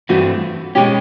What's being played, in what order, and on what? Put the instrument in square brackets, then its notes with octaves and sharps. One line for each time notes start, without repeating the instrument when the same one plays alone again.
[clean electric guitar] G2 E3 A3 C4 [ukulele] F#4
[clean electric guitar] B2 G#3 C#4 [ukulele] G4